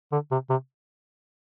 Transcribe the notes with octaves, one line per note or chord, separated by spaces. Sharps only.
D3
C3
C3